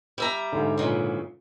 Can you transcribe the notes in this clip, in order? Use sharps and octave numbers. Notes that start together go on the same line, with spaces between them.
G3 E5 A#5
G#2 D3
A#2 C#3 E3